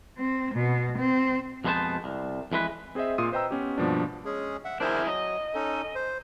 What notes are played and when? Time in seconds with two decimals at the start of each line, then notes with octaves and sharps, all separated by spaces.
0.16 C4
0.53 B2
0.97 C4
1.64 F2 B2 G#3 B3 C5 A5
2.04 C2
2.52 F2 E3 G#3 B4
2.95 C4 G#4 C5 D#5 E5
3.18 A#2 F4 C6 D#6 D#7
3.32 B4 C5 D#5 G5 A#5 E6
3.51 B3 C#4 G4
3.78 G2 B2 F3 A#3 D4
4.25 G#3 C#4 G#4
4.65 E5 F#5
4.80 D4 E4 G#4 A#4 C5
5.07 F#3 D#5
5.55 C#4 D#4 A4
5.95 C5